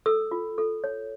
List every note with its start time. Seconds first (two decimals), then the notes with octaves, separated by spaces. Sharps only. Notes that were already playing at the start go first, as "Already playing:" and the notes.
0.06 A4 E6
0.31 F4
0.58 A4
0.84 C#5